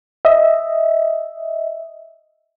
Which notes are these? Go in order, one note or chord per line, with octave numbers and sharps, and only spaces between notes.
D#5 E5